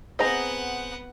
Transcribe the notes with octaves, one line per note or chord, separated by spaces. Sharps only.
B3 C4 G#4 C5 D#5 F#5 A#5